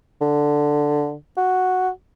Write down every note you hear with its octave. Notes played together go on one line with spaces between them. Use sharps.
D3
F#4